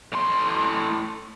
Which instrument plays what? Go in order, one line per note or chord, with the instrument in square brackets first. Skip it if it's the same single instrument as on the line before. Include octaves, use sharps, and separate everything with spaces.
[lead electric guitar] A2 C6